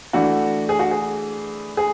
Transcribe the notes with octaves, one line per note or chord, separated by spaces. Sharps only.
E3 A3 D4 F#4
G#4
F#4
G#4
G#4